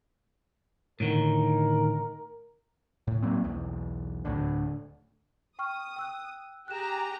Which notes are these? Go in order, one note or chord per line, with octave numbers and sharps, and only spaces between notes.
A2 D3 D#3 A#4
A2
F#3 A#3 C4
B1 E2
D1 A2 D3
G5 C#6 D#6 F6
G5 E6 F#6
G4 G#4 A#5 F#6 E7